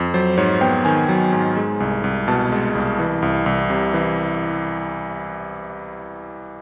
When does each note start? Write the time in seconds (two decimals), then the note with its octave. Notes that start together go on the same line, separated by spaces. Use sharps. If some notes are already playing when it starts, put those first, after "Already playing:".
Already playing: F2
0.14 F#3 C5
0.37 G#2 C#5
0.61 B3 G5
0.85 D#3 G#5
1.09 F#3
1.33 G#2
1.57 G#3
1.80 C2
2.04 C2
2.28 B2 A5
2.52 G#3
2.75 C2
2.99 E3
3.22 C2
3.46 C2
3.70 C3
3.94 E3